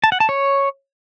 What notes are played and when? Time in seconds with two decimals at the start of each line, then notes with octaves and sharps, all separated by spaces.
0.04 A5
0.12 F#5
0.20 A5
0.29 C#5